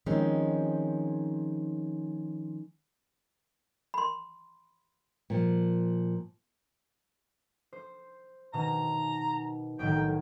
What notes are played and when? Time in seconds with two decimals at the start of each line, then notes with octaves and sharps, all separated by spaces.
0.06 D#3 F3 G#3 C4 C#4
3.94 B5 C6
5.30 A#2 F3
7.73 C5
8.53 B2 D#3 A#5
9.79 B1 A2 D#3 G5